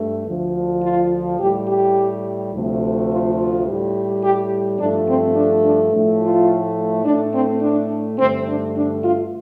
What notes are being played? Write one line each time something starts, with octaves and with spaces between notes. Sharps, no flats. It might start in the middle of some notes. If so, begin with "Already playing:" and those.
Already playing: G2 A3
D2 D3 F3
F4
A2 G3 G4
G4
D2 C3 F3 A3
F4
F4
A2 G3
G4
G2 F3 A3 D4
C4
D4
D4
A2 F3 A3
F4
A2 A3 D4
C4
D4
G2 D3 A3 C4
D4
D4
F4